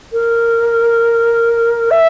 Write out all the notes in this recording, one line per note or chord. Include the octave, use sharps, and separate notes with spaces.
A#4
E5